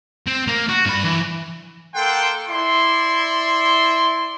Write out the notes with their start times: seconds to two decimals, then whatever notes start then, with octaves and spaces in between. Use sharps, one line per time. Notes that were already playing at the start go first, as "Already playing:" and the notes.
0.27 C4
0.47 A#3
0.69 F#4
0.86 G2 B5
1.04 E3
1.93 A#3 A4 F#5 G5 C6
2.47 E4 D5 C6